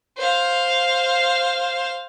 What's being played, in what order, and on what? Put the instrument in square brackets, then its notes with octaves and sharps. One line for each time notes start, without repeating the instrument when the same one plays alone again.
[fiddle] C5 F5